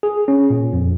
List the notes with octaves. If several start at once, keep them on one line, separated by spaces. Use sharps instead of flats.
G#4
C#4
A#2
F2